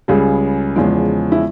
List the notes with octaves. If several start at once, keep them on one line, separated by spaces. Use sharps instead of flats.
C#2 C#3 G3 G#4
E2 C#3 F3 G#3
E4